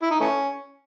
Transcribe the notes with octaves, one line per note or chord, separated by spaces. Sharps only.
E4
D#4
E3 A3 C#4